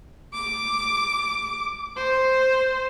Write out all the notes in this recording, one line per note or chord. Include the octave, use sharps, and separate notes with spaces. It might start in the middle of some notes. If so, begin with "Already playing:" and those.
D6
C5